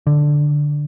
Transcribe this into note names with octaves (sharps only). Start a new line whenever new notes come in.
D3